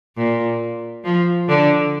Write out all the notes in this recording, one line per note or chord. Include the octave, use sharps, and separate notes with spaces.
A#2
F3
D3